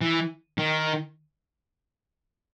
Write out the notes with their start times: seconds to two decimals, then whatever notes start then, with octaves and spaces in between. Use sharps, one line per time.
0.01 E3
0.58 D#3